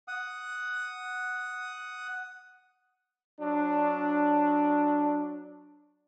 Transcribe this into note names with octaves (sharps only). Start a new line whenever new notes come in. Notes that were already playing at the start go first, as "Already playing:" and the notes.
F#5 D#6
F#3 D4